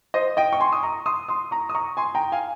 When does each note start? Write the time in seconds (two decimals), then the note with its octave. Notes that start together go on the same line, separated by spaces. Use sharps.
0.14 C5 D#5
0.37 D#5 G5
0.52 C#6
0.60 G#5 C6
0.72 D#6
0.83 A#5 C#6
1.06 C6 D#6
1.28 C6 D#6
1.51 A#5 C#6
1.69 D#6
1.75 A#5 C#6
1.97 G#5 C6
2.15 G5 A#5
2.32 F5 G#5